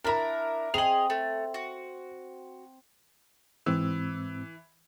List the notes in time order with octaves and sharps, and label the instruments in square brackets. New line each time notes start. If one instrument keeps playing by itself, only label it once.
[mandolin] D4 E4 [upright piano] A#4 A#5
[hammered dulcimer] C4 [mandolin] G#4 D#5 [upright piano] F7 F#7
[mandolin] A3
F#4
[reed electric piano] G#2 C4 E6 [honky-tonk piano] E3